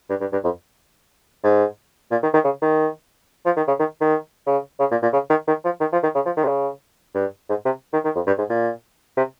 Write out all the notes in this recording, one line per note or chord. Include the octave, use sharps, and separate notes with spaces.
G2
G2
G2
F2
G#2
A#2
D#3
D#3
C#3
D#3
F3
D#3
C#3
D#3
D#3
C#3
C#3
A#2
A#2
C#3
D#3
D#3
F3
D#3
F3
D#3
C#3
F3
D#3
C3
C#3
G2
G#2
C3
D#3
D#3
F2
G2
G#2
A#2
C3